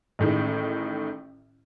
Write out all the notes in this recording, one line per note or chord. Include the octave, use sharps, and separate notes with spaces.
A1 A2 D#3 G#3